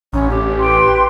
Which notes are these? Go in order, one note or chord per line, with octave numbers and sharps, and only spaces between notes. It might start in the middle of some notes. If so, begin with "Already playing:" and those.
A1 C#4
G4
B4 G5 C6